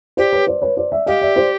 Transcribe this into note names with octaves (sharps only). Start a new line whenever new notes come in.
G4 C5 D5
B4 C#5
C5 D5
B4 C#5
C5 D5
D5 E5
G4 D#5 F5
D5 E5
C5 D5